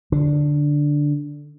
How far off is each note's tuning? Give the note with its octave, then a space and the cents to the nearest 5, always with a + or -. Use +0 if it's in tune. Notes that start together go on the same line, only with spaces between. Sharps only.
D3 +0 D4 +0